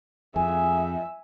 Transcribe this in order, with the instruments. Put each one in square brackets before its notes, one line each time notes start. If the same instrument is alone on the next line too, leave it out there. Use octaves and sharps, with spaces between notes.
[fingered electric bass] F2 [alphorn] G#4 [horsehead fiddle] E5 [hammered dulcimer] G#5